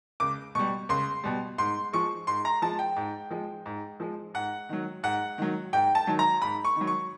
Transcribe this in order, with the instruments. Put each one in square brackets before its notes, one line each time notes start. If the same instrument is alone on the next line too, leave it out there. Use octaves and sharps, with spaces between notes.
[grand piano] C#2 D6
B2 G3 C#6
C#2 C6
B2 G3
G#2 C6
F3 G#3 C#6
G#2 C6
A#5
F3 G#3 A5
G5
G#2
F3 G#3
G#2
F3 G#3
G#2 F#5
D#3 F#3
G#2 F#5
D#3 F#3
G#2 G5
A5
D#3 F#3
A#5
G#2 B5
C#6
D#3 F#3
C#6